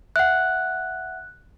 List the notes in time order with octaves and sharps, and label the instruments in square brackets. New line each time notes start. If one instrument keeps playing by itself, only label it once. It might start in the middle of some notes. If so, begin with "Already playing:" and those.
[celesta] E5 F#5 [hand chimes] F#6